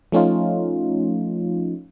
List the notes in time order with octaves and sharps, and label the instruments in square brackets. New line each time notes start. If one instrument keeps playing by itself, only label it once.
[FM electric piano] F3 A3 C#4 D#4 F4